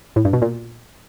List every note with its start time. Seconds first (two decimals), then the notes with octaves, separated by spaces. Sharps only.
0.16 A2
0.25 G2
0.33 B2
0.42 A#2